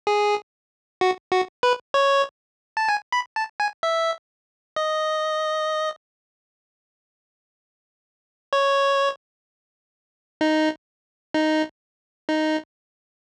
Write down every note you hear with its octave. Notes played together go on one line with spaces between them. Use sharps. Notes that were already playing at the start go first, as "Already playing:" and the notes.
G#4
F#4
F#4
B4
C#5
A5
G#5
B5
A5
G#5
E5
D#5
C#5
D#4
D#4
D#4